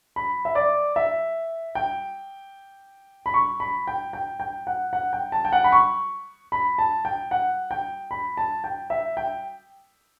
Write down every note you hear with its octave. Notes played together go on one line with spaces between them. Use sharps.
B5
E5
D5
E5
G5
B5
C#6
B5
G5
G5
G5
F#5
F#5
G5
A5
G5
F#5
B5
C#6
B5
A5
G5
F#5
G5
B5
A5
G5
E5
G5